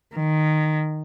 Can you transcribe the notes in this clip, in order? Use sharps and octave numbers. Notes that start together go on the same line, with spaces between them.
D#3